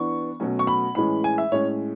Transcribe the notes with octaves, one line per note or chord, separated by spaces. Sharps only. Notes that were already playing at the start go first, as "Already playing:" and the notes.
Already playing: E3 B3 D4 C#6
B2 F#3 A3 C#4
C#6
B5
A2 E3 G#3 C#4 B5
G#5
E5
A2 G#3 C#4 C#5